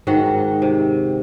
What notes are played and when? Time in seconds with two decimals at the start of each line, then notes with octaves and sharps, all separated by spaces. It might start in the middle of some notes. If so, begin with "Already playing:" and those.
0.07 G#2 D#3 F#4 F#5
0.62 C3